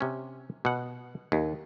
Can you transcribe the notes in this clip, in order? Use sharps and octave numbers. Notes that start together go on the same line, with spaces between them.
C3 C#4
B2 F#5
D#2